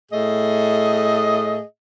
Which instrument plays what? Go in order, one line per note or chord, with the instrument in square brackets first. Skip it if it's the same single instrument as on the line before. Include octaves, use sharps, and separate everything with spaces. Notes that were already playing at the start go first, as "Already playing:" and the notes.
[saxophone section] A2 A3 G#4 D#5